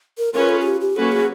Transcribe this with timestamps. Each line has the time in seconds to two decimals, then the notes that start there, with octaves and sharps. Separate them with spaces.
0.18 A#4
0.34 C#4 F4 G#4 A#4 B4
0.49 A4
0.60 G#4
0.65 G4
0.81 G4
0.96 F#3 A#3 C#4 F#4 A4 B4
1.12 G#4